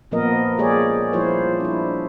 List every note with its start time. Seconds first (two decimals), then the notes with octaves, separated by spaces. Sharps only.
0.11 A#2 F3 A#3 B3 A#4 D#5
0.58 G#3 A#3 G4 G#4 C#5 D5
1.13 F3 G3 E4 F4 C5 C#5
1.60 D4 E4